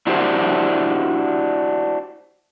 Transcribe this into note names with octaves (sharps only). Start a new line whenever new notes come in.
D4 E4 F#4 G4 C5 D5